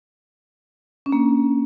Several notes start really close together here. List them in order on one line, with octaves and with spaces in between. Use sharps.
C#4 D4 A#3